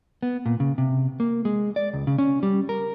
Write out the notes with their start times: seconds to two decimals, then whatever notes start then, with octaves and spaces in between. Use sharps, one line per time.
0.23 B3
0.46 A#2
0.60 C#3
0.78 C3
1.20 A#3
1.45 G#3
1.76 D5
1.93 C#2
2.07 C#3
2.18 C#4
2.43 G3
2.69 A#4